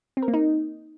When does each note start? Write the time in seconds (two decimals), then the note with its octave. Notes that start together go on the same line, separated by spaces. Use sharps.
0.17 C4
0.23 A#4
0.28 A#3
0.34 D#4